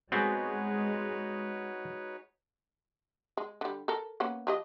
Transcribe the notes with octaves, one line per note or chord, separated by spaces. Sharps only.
G#3 B3 C4 D#4 F#4 G#4 B4 C#5
G#3
D3 G3
A4 A#4
A#3 B3 C#4
F3 G4 D#5